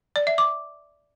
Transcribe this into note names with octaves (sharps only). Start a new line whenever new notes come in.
D5
E5
D6